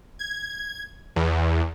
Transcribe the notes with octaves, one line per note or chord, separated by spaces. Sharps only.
G#6
E2